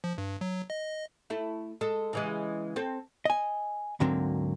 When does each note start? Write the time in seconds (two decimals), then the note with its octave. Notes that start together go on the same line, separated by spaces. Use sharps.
0.04 F3
0.18 G2
0.41 F#3
0.70 D#5
1.30 A3 E4
1.81 G#3 A4
2.13 C#3 E3 G#3
2.76 C4 A4
3.25 D#5 G#5
4.00 D2 G#2 D3 F#3 A#3 C4